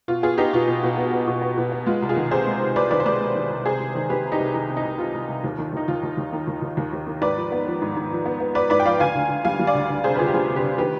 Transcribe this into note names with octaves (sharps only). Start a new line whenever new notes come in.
B2 F4
B3 F4 G#4
B3 D#4 G4
B2 F4
B2
B2
B3
B3
B2
B3
B2
B3
G#3 F4
C2
F4 G#4
D#3
C3 G#4 C5
G#3
C3
C2 B4 D5
D#3 B4 D5
C5
G#3 B4 D5
G#3
D#3
C2
C3 G#4 C5
C2
D#3
D#3 G4 B4
C3
D#4 G4
C2
D#3 D#4
C3
D#4
C2
C3 F4
C2
C2
D#2
D#3
D#2 D#4
D#2 F4
D#2
D#2
D#3
D#2
D#2
D#2
D#2
D#3
G#2 B4 D5
F3
B3
F3
G#2
G#2
F3
B3
B3
B3 B4 D5
G#2 B4 D5
G5
F3 D5 F5
D2 F5 G#5
D2
D2
G3 F5 G#5
G3
D5 F5
D2
D2
C3 G#4 C5
B4
D2 F4 G#4
G4
G3 F4 G#4
C3
G4 B4
D2
D#3 G4 B4